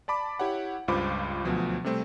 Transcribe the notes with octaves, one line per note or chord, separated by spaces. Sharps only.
D5 A5 B5 D6
E4 G4 C#5 F#5
C#2 G2 F4 C5 B5 D6
D2 B2 F3 F#3
C3 G3 A3 C4